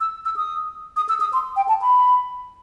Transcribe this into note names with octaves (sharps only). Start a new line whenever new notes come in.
E6
E6
D#6
D#6
E6
D#6
C6
G5
A5
B5